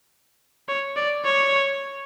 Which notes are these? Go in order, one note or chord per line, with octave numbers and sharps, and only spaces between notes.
C#5
D5
C#5